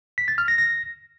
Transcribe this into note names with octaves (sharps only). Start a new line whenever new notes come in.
B6
A6
F6
A#6
A#6